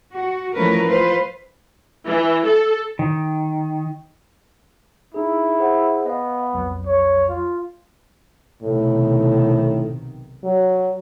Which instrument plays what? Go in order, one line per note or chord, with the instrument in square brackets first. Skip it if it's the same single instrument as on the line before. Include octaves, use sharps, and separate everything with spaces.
[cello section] F#4
E3 F3 A3 C#4 A#4 B4
F4 B4 C5
[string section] E3
A4
[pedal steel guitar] D#3
[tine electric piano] D#4 G#4 [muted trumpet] E4
[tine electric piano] G#4 C5 F#5
[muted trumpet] B3 [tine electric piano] D#5 F5
[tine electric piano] B1 F2 F#3
[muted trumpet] C#5
F4
[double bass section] B1 C3 D#3 [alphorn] A2
[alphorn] F#3